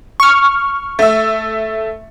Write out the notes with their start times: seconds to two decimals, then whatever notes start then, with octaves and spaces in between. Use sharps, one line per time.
0.20 C#6 F6
0.99 A3 E5